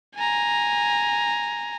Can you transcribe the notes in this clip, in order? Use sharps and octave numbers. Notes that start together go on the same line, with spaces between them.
G#5 A#5